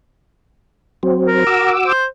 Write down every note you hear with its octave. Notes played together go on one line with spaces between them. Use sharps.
F#3 C4
A#4
F#4 D6 E6
C5